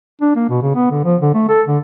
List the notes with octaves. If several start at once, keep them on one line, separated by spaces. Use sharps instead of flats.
D4
A#3
B2
C#3
B3
D3
F3
D3
A3
A4
D3